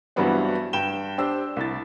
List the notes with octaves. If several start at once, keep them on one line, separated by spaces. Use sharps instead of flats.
G2 E3 F#3 G3 B3 C4
G2 G5 E7 G7
D4 G4 C5 E6
C2 E4 A6